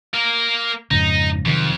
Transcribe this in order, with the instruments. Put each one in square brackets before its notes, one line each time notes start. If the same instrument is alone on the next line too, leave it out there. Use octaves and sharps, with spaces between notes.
[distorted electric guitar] A#3 A#4
[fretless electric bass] F2 G#2 C#3 [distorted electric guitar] D#4
[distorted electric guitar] F2 [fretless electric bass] C3 D#3 F#3